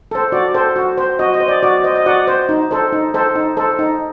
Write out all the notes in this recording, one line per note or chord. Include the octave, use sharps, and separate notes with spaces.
A4 C5
F#4 D5
A4 C5
F#4
C5
F#4 D#5
D#5
C5
D5
F#4 D5
C5 D#5
D#5
F#4 D5 F#5
C5
D#4
A4 C5
D#4
A4 C5
D#4
A4 C5
D#4